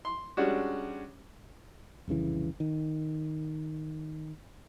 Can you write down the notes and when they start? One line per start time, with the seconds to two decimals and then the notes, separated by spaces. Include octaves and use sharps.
0.05 C6
0.37 G3 G#3 C#4 D4 F#4
2.08 F1 C2 C#3 E3
2.60 D#3